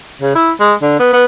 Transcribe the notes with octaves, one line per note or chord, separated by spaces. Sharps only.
C#3
E4
G#3
D3
B3
B3